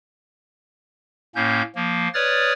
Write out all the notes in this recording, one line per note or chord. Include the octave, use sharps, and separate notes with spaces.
A2 A#3 C#4 G6
F3 A#3
B4 C#5 D5 D#6 F6 A6